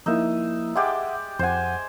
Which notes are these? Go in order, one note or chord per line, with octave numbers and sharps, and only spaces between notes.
F3 A#3 D#4 E4 E5
G#3 G4 D5 E5 F#5
F2 C5 F#5 G#5